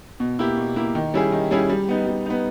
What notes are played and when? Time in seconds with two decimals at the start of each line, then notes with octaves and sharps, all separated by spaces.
0.20 B2
0.39 A#3 E4 G4
0.57 B2
0.76 A#3 E4 G4
0.95 D#3
1.14 G3 C#4 E4 G#4
1.32 D#3
1.51 G3 C#4 E4 G#4
1.70 G3
1.89 B3 D#4
2.07 G3
2.26 B3 D#4